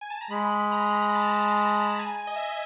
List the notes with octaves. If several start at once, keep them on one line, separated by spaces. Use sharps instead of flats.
G#5
A5
A#5
G#3 B5
A#5
B5
A#5
A5
G#5
D#5
E5
D#5